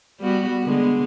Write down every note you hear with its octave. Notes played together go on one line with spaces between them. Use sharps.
G3 B3 F#4
D3 G#3 B3